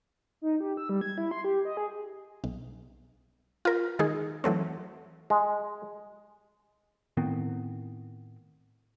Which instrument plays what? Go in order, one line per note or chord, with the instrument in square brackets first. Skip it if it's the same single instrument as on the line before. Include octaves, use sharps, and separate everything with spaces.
[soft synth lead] D#4
G4
E6
G3
G#6
E4
C6
G4
D#5
G#4
[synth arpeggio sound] B1
F4 A#4
D#3 G#3 D#4 G#4
E3 F#3 A3 C4
[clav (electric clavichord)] G#3
[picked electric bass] A2 D#3 B3 C4